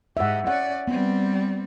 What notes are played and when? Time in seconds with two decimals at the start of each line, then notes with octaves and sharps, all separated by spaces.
0.17 G#2 G4 E5 F#5
0.47 C#4 D5 F#5
0.88 G3 B3 C4